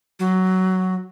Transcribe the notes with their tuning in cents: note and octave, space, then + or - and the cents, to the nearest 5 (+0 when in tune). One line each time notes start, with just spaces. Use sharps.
F#3 +10